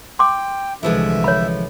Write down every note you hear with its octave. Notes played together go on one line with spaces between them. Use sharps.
G5 C6 D6
C2 D3 E3 F3 G#3 E5
C#5 B5